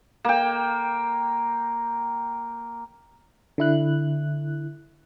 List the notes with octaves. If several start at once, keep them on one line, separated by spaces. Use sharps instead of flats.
A#3 G5
D3 E4 F#6